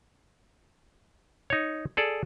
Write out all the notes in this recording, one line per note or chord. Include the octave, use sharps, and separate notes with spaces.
D#4 C#5
G#4 A4 D5